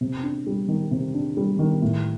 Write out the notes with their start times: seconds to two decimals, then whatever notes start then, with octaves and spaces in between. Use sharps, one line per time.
0.01 C3
0.23 D4
0.47 G3
0.68 D#3
0.91 C3
1.14 D4
1.37 G3
1.59 D#3
1.82 A2